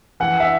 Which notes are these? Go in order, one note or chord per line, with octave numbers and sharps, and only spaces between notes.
E3 F#5
E5